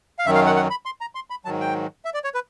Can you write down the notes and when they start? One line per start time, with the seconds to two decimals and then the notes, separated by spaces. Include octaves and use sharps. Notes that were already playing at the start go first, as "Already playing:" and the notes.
0.19 F5
0.26 F#2 D#3 F#3 E5
0.35 F5
0.46 F#5
0.56 F#5
0.70 B5
0.86 C6
1.01 A#5
1.15 C6
1.30 B5
1.45 G#2 D#3 F#3 A5
1.60 G5
2.05 E5
2.14 D5
2.24 C#5
2.34 B4